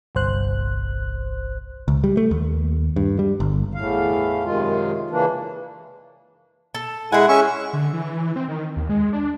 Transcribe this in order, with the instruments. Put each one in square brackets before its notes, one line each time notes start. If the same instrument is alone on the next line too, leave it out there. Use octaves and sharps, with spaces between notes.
[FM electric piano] G1 C2 C5 F#6
[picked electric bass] C#2
G3
A3
D#2
G2
G3
G1
[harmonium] E2 A2 F5
F#2 C3 D#3 G#3 F4
C#3 E3 A#3 D4
[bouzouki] A4
[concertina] G#3 E4 F#5 [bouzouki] G#4 G#5
[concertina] C#4 E5 C#6
[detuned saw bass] D3
E3
C4
D#3
D#2
G#3
D4